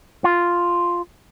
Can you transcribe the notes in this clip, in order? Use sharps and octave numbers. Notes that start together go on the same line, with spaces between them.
F4